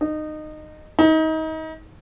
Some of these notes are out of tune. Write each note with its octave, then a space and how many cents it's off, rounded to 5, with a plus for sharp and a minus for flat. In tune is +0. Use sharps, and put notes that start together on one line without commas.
D#4 -20
D#4 +30